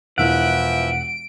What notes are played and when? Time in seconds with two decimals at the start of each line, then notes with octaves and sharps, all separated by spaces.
0.18 E1 E3 F3 E4 E5 F#5 D7